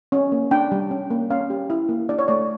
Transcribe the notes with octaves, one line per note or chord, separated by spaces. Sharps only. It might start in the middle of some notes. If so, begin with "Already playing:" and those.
C#4
A#3
D4 G5
G3
C#4
A#3
C#4 F5
G4
E4
A#3
D4 D5
C#5
A3 D5